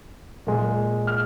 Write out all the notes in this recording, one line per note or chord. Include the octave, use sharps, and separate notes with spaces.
A#2 G#3
F6